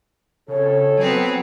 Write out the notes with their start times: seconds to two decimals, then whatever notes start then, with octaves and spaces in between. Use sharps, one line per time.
0.48 F2 C#3 A4 C#5
0.98 F#3 B3 C4 G#4